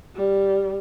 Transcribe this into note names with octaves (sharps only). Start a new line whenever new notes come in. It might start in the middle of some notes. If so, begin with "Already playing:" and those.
G3